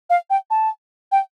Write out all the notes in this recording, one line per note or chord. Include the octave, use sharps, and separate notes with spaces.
F5
G5
A5
G5